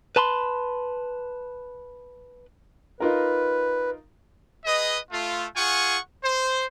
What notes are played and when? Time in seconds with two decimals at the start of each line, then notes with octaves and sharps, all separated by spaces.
0.16 B4 A5 B5 C6
3.00 D#4 F4 A#4 B4
4.65 G#4 B4 D#5
5.11 A3 F4
5.56 F4 G#4 F#5 G#5 C#6
6.24 C5